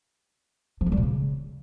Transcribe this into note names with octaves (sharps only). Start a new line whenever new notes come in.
F3
A3
G3
B2
C#3